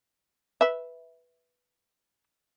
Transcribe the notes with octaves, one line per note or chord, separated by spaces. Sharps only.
B4 E5